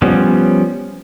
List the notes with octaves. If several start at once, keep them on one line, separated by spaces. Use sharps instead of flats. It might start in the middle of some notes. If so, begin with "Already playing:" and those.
F3 G3 B3 C#4